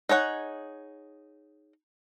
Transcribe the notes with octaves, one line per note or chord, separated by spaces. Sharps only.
D#4 G#4 C#5 F#5